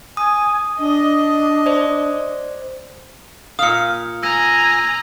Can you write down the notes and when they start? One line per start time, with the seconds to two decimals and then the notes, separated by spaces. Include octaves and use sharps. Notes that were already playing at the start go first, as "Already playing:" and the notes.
0.17 G#5 D#6
0.79 D4 D#5
1.66 C5 D5
3.59 A#2 F5 D#6 F6 C#7
4.23 G#5 A#5 E6 A#6